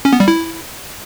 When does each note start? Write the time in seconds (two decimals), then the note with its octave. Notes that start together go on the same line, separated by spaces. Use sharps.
0.05 C#4
0.13 B3
0.20 G3
0.28 E4